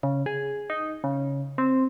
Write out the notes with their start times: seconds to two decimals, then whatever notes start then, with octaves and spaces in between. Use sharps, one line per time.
0.03 C#3
0.26 G#4
0.70 D#4
1.04 C#3
1.58 C4